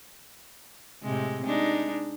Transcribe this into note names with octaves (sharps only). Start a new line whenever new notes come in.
A2 C3 G#3
G#3 D4 D#4